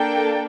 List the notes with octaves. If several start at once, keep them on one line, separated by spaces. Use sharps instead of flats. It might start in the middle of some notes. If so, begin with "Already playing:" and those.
Already playing: A#3 D4 A4 G5